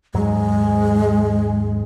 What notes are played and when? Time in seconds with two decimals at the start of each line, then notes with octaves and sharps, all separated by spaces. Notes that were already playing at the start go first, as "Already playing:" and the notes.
0.14 D#2 G#2 F#3 G#3